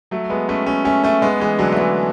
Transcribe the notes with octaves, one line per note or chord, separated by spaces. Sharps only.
F#3 A3
G#3 B3
A3 C#4
A3 C#4
A3 C#4
A3 C#4
G#3 B3
E3 G#3
D3 F#3
A3
E3 G#3